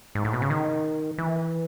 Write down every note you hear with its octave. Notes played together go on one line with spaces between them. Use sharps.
G#2
A2
B2
C#3
D#3
E3